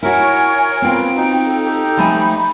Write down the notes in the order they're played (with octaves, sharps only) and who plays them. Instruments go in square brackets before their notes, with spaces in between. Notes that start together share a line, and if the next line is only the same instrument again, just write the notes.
[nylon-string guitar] E4 F#4 [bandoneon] A#4 [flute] C#5 [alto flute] G#5
[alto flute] B3 [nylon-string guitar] C4 F4 [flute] G5
[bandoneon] D#4 [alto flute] F#4
[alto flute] A4
[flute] G4 [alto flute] A4
[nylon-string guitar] F3 A3 G#5 [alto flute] B5